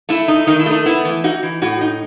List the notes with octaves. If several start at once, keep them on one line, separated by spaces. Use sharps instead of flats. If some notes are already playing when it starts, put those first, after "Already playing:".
A3 E4
D#4
D#3 D#4
E4
A3 D#4
B3 E4
E3
D#4 F#4
E3
A2 F#4
D#4